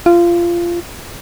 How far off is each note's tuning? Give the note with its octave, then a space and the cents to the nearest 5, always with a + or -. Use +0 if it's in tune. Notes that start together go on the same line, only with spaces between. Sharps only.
F4 -20